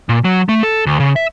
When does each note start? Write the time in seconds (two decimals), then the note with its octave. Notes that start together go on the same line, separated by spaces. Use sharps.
0.09 A#2
0.24 F#3
0.49 A3
0.63 A4
0.86 D2
1.00 C#3
1.16 E5